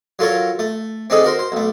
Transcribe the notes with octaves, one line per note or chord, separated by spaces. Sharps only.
F#3 F4 A4 A#4 C#5
A3
C4 D4 D#4 G#4 A4
F#4 A#4 C5
C5
B1 A3